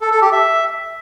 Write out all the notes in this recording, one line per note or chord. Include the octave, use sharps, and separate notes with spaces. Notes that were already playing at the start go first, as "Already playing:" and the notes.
A4
A4
G4
E5